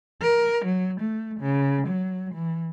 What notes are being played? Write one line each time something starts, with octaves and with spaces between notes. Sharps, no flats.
A#4
F#3
A3
C#3
F#3
E3